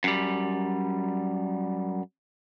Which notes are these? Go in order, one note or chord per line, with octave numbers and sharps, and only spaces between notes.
F#2 G3